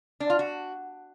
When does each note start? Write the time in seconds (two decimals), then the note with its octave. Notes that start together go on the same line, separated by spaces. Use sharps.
0.20 D4
0.30 F4
0.39 F#4